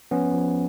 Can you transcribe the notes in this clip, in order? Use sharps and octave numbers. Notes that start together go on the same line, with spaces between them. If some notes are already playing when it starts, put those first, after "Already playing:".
F3 B3 C#4
F3